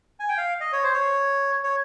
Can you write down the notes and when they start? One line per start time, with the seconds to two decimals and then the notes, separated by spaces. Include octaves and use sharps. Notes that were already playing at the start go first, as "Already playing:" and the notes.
0.20 G#5
0.29 G5
0.38 F5
0.61 D#5
0.72 C#5
0.83 C5
0.94 C#5
1.64 C#5